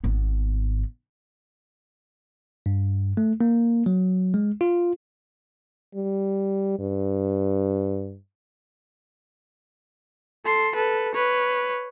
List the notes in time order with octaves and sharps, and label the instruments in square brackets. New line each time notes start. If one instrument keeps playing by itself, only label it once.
[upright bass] G#1 B3
[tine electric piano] G2
A3
A#3
F#3
G#3
F4
[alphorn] G3
G2
[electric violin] A4 C6
A4 B4
B4 C#5